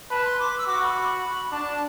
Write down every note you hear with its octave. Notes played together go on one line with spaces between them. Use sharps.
B4 A5
C6
D6
E6
F#4 D6
B5
D4 A5